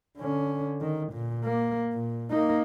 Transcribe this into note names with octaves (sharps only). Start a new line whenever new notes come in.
D3 C#4
D#3
A#2
A#3
A#2
A#3 D#4